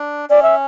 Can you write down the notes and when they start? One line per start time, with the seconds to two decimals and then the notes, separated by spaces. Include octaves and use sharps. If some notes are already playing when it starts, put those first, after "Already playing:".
Already playing: D4
0.30 C#4 D5
0.43 E5